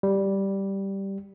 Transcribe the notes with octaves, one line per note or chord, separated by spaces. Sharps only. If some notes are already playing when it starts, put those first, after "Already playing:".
G3